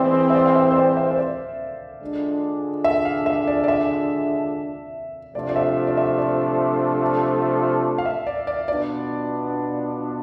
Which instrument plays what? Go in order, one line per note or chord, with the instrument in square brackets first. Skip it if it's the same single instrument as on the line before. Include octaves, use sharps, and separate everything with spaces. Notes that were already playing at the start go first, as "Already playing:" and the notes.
Already playing: [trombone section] E3 G#3 C4 [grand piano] D5 E5
[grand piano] C5
E5
D5
F5
E5
C5
D5
E5
C5
D5
[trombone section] D3 G#3 D4 F4
[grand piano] E5
F5
E5
D5
D5
E5
[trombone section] C3 F3 A3 D4 F4 [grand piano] D5
[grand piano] D5
E5
D5
E5
D5
F5
E5
D5
D5
[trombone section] B2 B3 D4 F4 [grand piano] D5